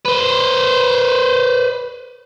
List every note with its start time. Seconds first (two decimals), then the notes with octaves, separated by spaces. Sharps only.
0.06 B4 C5